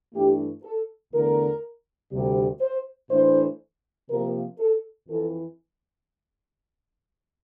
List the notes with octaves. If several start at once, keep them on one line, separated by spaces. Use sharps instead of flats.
G2 E3 A3 D4 G4
A4
E2 D3 A3 A#4
D2 C3 G3
C5
A2 E3 A3 D4 C5
C3 F3 A#3 A#4
A4
F2 E3 A4